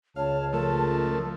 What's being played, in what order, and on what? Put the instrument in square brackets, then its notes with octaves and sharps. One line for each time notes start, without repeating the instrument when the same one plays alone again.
[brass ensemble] C#2 [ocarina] C#5 [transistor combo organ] F5 [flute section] A5
[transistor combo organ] F3 A3 [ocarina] A#4